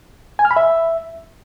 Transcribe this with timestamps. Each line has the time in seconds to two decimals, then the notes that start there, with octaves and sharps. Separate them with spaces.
0.39 G#5
0.45 F6
0.51 B5
0.56 E5